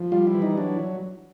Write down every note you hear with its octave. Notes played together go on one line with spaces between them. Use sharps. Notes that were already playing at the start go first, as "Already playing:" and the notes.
Already playing: F3
G3 F4
E4
E3
D#4
F#3 D4